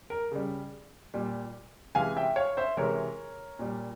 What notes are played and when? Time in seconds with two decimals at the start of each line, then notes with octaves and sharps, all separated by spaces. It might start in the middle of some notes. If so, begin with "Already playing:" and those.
0.10 A#4
0.31 C#3 G3
1.14 A#2 G3
1.95 C3 E3 G#3 F5 G#5
2.17 E5 G5
2.36 C#5 F5
2.57 C5 E5
2.77 C3 E3 G#3 A#4 C#5
3.59 A#2 G3